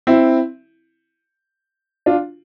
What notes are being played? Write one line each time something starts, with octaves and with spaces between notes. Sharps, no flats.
C4 E4
D4 F4